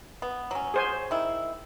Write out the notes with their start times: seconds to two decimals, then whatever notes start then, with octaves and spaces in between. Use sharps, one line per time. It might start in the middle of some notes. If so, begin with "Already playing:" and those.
0.22 B3
0.51 F#3 C#4
0.74 G#4 C5 G#5
1.11 D#3 E4